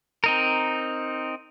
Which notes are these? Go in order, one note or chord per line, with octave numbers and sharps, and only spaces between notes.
C4 D#4 A#4